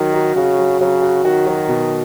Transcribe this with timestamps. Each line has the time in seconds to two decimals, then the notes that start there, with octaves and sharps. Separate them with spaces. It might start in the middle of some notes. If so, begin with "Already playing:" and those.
Already playing: D#3 F#3
0.14 F#4
0.36 C#3 F#4
0.59 F#3
0.80 C#3 F#3
1.02 F#4
1.24 D#3 F#4
1.47 F#3
1.68 B2